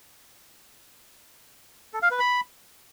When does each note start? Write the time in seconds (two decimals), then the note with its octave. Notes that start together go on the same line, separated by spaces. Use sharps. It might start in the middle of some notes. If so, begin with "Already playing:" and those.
1.94 A4
2.02 F5
2.11 B4
2.19 B5